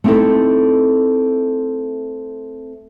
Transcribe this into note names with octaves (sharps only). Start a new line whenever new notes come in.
A3 C4 D#4 E4 A4